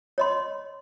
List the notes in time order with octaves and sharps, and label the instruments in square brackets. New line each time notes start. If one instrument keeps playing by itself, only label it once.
[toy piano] C#5 D#5 C6